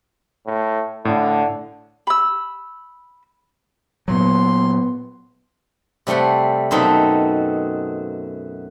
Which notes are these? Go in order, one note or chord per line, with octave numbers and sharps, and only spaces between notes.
A2
A2 D3 D4
B5 E6
A#2 F#3 B3 C6
C3 G3 A3 C5 F#5
F#2 B2 C4 D#4 A4 B5